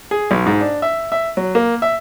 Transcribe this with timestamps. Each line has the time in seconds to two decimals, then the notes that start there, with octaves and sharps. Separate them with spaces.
0.11 G#4
0.31 B1
0.46 G#2
0.61 D4
0.82 E5
1.12 E5
1.37 F#3
1.55 A#3
1.82 E5